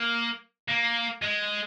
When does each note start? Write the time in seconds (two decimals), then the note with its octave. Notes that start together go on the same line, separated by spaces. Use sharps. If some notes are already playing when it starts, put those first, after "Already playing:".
Already playing: A#3
0.68 A#3
1.22 G#3